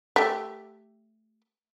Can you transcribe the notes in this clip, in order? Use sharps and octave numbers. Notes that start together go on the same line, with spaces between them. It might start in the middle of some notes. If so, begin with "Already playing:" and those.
A3 G4